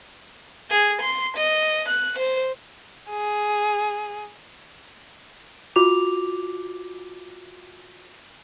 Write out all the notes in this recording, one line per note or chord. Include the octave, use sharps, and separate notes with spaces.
G#4
C6
D#5
F#6
C5
G#4
F4 F#4 D6 F7